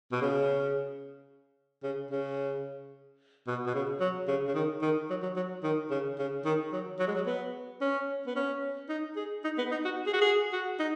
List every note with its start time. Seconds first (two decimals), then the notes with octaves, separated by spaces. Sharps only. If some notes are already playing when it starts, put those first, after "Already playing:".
0.12 B2
0.21 C#3
1.83 C#3
2.11 C#3
3.47 B2
3.66 B2
3.74 C#3
4.00 F#3
4.27 C#3
4.47 C#3
4.55 D#3
4.82 D#3
5.10 F#3
5.22 F#3
5.36 F#3
5.63 D#3
5.90 C#3
6.19 C#3
6.45 D#3
6.72 F#3
6.99 F#3
7.07 G#3
7.15 F#3
7.26 B3
7.81 C#4
8.27 B3
8.36 C#4
8.89 D#4
9.16 G#4
9.44 D#4
9.58 B3
9.71 D#4
9.85 F#4
10.06 G#4
10.13 F#4
10.21 G#4
10.53 F#4
10.79 D#4